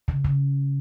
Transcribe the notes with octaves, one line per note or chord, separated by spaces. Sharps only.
C#3
C#3